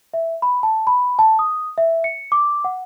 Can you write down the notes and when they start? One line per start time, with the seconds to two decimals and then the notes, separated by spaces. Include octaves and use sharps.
0.14 E5
0.42 B5
0.63 A5
0.87 B5
1.19 A5
1.39 D#6
1.78 E5
2.04 C#7
2.32 D6
2.65 F#5